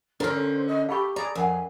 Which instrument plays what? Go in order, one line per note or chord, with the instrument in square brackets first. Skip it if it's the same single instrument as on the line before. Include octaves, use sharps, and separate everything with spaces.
[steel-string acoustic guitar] D3 C#4 [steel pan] D4 A#4 [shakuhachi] C5
[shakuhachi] D#5
[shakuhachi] G4 [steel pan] A4 [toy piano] F5 B5 C#6
[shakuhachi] G#4 [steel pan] D5 [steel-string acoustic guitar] A#5
[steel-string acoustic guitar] F2 [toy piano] A#4 F#5 [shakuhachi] G#5